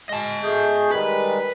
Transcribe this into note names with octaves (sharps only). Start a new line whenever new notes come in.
G#3 D#5 A5
A3 G#4 G6
D#3 G3 G#3 B4